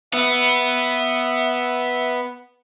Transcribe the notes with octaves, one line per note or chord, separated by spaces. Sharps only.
B3 E5